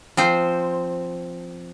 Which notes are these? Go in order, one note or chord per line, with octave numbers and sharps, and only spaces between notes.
F3 C4 C5